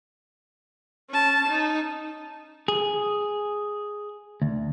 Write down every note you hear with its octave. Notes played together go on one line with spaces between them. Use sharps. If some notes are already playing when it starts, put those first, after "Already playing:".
C#4 A5
D#4
G#4
D2